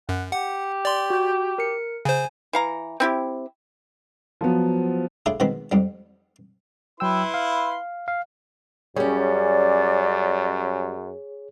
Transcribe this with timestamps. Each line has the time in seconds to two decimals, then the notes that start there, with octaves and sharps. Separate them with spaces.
0.09 F#2 F#5
0.32 G4 F#5
0.85 D5 C6
1.10 F#4 G6
1.58 A#4 C#7
2.05 C#3 C5 G#5
2.53 E3 F5 A#5
3.00 C4 E4 G4
4.41 F3 F#3 B3
5.26 A2 D4 E4 F4 G#4
5.40 B2 D#3 G#3 C4 B5
5.72 F2 G#2 G3
7.00 F#3 E4 B4 G5 C6 E6
7.34 F5
8.08 F5
8.96 F#2 G3 C#4 G#4 C#5 D5